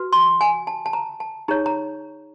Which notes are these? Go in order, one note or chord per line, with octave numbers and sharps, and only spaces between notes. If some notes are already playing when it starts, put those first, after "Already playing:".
Already playing: F#4 B4
C6
G#5
A5
A5
A#5
A5
D#4 G#4 C#5 A#5
A#5